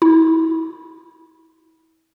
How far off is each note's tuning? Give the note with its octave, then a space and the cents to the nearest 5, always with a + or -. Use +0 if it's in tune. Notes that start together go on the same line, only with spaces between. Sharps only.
E4 -30